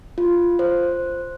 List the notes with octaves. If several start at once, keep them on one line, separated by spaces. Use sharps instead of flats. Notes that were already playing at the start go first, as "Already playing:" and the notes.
F4
C5